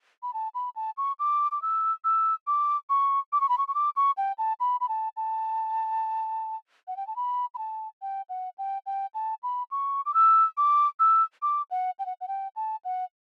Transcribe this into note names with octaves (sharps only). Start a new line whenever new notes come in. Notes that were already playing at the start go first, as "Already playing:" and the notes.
B5
A5
B5
A5
C#6
D6
D6
E6
E6
D6
C#6
D6
C#6
B5
C#6
C#6
D6
C#6
G5
A5
B5
B5
A5
A5
F#5
G5
A5
B5
B5
A5
G5
F#5
G5
G5
A5
B5
C#6
D6
E6
D6
E6
D6
F#5
G5
F#5
F#5
G5
A5
F#5